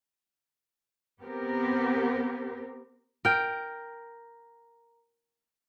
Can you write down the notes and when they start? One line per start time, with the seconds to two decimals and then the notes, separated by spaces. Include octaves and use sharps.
1.19 B3 C4 G4 A#4
3.25 A#4 G5